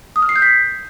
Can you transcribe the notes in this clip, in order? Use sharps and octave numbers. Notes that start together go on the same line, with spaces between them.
D#6
F6
C7
G6
B6